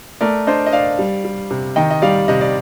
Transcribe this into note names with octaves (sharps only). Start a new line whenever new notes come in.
A3 A#4 D5
D4 C5 D#5
D#5
D4 D5 F5
G3
G3
C3
D#3 D#5 G5
D#5
G3 D5 F5
C3 D#5
D5